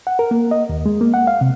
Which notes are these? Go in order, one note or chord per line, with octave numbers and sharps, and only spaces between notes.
F#5
A#4
A#3
D#5
D#2
G#3
A#3
F#5
F5
C3